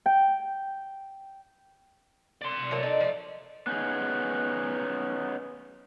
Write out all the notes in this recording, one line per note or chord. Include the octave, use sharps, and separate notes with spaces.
G5
D5 C6
F#3 A3 A#3
D#4 A4
F3 A3
B3 C#4 D#4 G#4